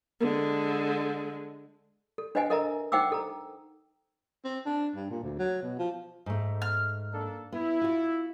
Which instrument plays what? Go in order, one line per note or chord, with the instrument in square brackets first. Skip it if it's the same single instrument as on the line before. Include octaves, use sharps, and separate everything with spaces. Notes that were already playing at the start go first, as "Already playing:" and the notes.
[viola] D3 G#3
[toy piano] A4
D4 B4 C5 D#5 F#5 G#5
A4 A#4 D#5 E5 A#5
D#4 C5 F#5 G5 D6 E6
A4 A#5
[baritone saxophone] C4
D4
G2
A#2
D2
F#3
B2
F3
[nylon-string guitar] G#2 A3
[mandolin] F6
[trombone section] A#3 D4 A4
[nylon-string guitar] B3 [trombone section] E4
[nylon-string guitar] F4 F#4